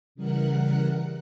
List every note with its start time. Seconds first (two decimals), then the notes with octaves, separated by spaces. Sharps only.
0.15 C#3 E3 G3 A#4 F#5 F#6